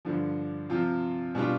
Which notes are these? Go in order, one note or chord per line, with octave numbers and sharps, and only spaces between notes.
G2 D3 F3
C3 F3 C4 F4
B2 G3 D4 F4